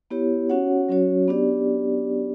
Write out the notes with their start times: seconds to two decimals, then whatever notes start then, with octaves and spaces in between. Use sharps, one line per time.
0.11 B3 E4 G4 C#5
0.50 C#4 F#4 C#5 F#5
0.89 F#3 C#4 F#4 C#5
1.28 B3 D4 G4 D5